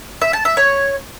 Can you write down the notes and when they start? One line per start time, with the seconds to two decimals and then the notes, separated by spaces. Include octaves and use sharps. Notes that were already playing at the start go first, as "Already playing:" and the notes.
0.21 E5
0.33 A5
0.45 E5
0.57 C#5